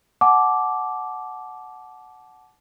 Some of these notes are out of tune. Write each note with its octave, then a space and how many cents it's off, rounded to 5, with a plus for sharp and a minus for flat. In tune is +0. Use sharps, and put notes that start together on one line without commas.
F#5 +0 A5 -30 D6 -5